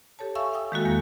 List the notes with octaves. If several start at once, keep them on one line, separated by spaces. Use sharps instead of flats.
G4 A4 C#5 A5
E5 F5 G#5 C#6 E6
F5 G5 D#6 E6
D#3 G#3 A#3 F#4 A4
E2 D#3 A#3 F5 G6 A#6